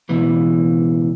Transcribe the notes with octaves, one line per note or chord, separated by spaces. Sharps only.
C#2 B2 E3